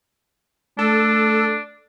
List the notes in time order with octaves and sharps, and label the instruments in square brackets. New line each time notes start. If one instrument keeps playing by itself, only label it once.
[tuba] A3 [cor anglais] D4 [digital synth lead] A4